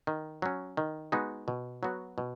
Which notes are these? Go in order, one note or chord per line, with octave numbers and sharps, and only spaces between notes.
D#3
F#3 C#4
D#3
G#3 B3 D#4 F#4
B2
F#3 B3 F#4
B2